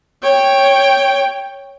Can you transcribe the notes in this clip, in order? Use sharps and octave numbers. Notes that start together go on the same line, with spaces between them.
C#5 G5